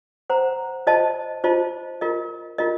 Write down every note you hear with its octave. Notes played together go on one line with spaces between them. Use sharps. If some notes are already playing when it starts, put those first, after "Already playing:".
C5 F#5 A#5
F4 C5 D#5 A5
F4 C5 D#5 A5
F4 A#4 D#5
F4 A#4 D#5